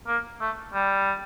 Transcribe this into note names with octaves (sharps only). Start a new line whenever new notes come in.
A#3
A3
G3